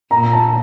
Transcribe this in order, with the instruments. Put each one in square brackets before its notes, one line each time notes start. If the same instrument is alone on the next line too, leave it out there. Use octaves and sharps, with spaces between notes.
[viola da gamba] A#2 [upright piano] A#5
[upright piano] A5